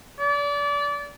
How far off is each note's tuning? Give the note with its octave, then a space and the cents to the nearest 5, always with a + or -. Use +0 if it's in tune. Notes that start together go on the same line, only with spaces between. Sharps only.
D5 -30